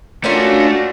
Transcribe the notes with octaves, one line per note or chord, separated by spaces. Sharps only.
A3 A#3 C#4 D4 F4 F#4